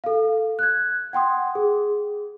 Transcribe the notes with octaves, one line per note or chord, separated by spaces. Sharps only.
A4 F5
F#6 G#6
F#5 G5 C6 D#6
G#4